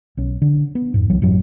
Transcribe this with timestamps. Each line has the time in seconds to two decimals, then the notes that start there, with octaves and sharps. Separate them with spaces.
0.17 B1 C#4
0.42 D3
0.75 B3
0.94 F2 G#2
1.09 C2 E3 F#3
1.22 A1 F#2 F#3